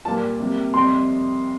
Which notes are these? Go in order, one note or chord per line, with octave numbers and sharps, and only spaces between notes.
A#2 G3 A#3 A5
C3 G3 A#3
F2 C3 G3 C6